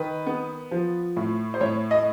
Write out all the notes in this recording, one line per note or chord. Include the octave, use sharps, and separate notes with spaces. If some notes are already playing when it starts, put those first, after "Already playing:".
Already playing: D#3 B4
B3
F3
A2
C5
A2 C#5
D#5